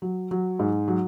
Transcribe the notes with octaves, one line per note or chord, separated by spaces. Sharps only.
F#3
F#3
G#2
F#3